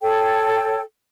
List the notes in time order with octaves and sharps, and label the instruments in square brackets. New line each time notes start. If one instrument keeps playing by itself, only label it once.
[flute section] A4 C#5 G5